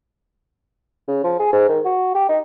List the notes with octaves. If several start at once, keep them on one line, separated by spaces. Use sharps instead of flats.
C#3
F3
G#4
G#2
D#3
F#4
G4
D#4